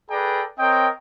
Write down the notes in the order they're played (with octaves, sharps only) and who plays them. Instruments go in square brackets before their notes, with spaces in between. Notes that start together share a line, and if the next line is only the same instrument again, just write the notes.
[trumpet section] G#4 A4 B4 D5 G5 A#5
C4 A#4 C#5 D#5 G5